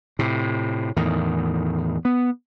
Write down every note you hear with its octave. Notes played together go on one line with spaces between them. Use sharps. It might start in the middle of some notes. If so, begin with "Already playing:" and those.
A2 C3
E2 A2 D#3
B3